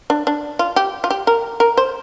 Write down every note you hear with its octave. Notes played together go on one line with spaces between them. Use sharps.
D4
D4
F4
G4
F4
G4
A#4
A#4
C5